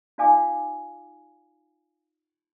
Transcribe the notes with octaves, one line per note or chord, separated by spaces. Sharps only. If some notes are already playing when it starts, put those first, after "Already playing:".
D#4 F4 D5 F5 G#5 D6